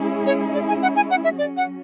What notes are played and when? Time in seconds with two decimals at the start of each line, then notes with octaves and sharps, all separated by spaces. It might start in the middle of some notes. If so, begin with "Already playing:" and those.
Already playing: G#3 C#4 E4 G#4
0.26 C#5
0.54 D5
0.68 G#5
0.82 F#5
0.96 G#5
1.10 F#5
1.24 E5
1.38 F#3 C#4 F#4 D5
1.57 F#5